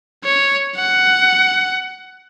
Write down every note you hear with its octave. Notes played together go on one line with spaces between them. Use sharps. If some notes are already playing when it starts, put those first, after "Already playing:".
C#5
F#5